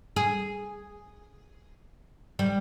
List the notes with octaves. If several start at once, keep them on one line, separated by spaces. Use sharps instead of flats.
G#4
G3